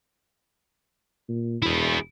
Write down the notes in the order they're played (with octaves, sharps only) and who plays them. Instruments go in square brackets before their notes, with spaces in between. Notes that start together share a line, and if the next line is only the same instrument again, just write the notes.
[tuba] A#2
[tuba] E1 [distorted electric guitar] E4 G#4